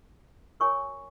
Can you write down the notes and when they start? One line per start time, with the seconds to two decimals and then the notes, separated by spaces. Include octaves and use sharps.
0.60 F#4 A#4 C#5 G#5 C#6